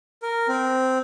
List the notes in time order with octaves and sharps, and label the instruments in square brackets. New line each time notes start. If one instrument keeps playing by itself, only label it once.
[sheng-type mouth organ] A#4
C4